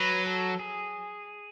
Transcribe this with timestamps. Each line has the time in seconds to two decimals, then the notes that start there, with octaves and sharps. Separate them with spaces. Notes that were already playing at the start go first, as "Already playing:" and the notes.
Already playing: F#3 B4
0.27 A4
0.59 G#4